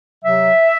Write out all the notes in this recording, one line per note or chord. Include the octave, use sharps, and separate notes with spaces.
C3 F#3 E5